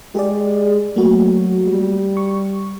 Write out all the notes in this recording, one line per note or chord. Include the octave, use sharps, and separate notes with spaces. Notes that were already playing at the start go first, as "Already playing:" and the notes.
G#3 G4 G#4 D5
F#3 A3 A#3 F#4
G3
C#6